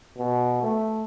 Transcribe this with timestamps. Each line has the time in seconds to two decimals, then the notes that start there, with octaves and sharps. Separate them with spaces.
0.17 B2
0.63 A3